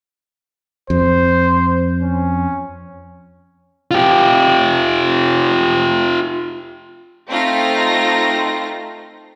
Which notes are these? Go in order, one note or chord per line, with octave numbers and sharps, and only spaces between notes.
F2 C5
C#4
F4 G4
A3 C4 D#4 F4 A#6